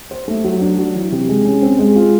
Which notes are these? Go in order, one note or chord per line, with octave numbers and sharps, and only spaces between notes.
C5
A3
F#3
D4
F#3
E3
C3
G#3
C#4
C4
G#3
F4